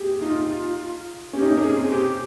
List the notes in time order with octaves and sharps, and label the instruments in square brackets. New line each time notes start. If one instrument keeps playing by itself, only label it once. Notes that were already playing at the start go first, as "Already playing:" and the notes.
Already playing: [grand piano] G4 G#4
[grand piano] D#4 [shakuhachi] F4
[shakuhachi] F4
F4
[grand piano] C#4 [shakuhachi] G4
[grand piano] D#4
C#4
[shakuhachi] A#4
G#4
[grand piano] C4
[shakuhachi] G#4
G4